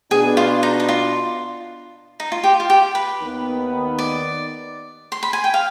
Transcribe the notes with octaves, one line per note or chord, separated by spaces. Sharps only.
B2 B3 D4 G#4
F4
D#4
D#4
F4
D#4
F4
G4
F4
G4
B4
D#2 D#3 B3
D5
C6
B5
G#5
G5
F5